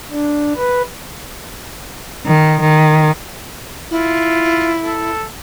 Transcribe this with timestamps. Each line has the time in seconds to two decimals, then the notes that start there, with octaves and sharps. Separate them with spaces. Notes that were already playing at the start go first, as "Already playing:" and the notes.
0.11 D4
0.56 B4
2.26 D#3
2.61 D#3
3.91 E4 F4
4.84 A4